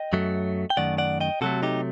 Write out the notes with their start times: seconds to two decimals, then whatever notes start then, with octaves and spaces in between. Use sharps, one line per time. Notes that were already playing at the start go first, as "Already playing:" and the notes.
Already playing: D#5 G5
0.13 F#2 F#3 A3
0.70 G5
0.77 F#2 D#3 A3 D5 F#5
0.98 D5 F#5
1.20 D#5 G5
1.41 C3 F#3 A3 F#4 A4
1.63 D#4 G4